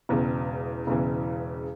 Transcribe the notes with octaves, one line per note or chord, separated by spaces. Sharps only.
E1 E2 C#3
E1 E2 C#3 E3